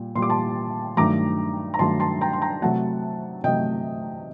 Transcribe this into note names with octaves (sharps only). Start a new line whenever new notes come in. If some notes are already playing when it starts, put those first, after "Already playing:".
Already playing: A#2 G3
A#2 G3 C6 D6
A5 C6
G2 D#3 F#3 A3 A#5 D6
A#5
G2 D#3 F#3 A3 A5 C6
A5 C6
G5 A#5
C6
G5 A#5
C3 F#3 A3 F#5 A5
C3 F#3 A3 D#5 G5